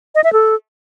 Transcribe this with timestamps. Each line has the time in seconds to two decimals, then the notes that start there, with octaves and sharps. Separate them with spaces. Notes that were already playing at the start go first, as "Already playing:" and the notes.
0.15 D#5
0.24 E5
0.33 A4